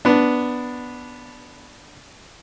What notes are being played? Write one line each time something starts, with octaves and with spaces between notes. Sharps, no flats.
B3 D4